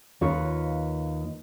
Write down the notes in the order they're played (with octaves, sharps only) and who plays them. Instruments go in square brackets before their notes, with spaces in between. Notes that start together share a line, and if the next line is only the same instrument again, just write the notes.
[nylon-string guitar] D#2 D#4 F4 B4 C#5